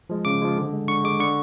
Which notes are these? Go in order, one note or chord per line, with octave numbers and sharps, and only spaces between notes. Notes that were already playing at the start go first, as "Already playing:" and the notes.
F3 G#3
C#3 D6
F3 G#3
D3
G#3
D3 C#6
G#3 D6
D3 C#6